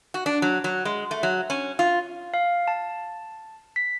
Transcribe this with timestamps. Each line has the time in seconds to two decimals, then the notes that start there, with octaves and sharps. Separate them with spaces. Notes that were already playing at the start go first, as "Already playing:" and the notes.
0.14 F#4
0.26 D4
0.42 F#3
0.64 F#3
0.85 G#3
1.11 A3
1.23 F#3
1.50 C#4
1.79 F4
2.34 F5
2.68 A5
3.76 B6